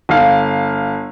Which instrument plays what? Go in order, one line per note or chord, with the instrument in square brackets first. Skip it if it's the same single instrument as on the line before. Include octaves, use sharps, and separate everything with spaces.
[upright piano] G1 F5